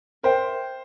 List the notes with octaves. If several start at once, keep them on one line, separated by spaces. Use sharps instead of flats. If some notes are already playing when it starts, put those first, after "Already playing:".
A#4 C5 E5 G5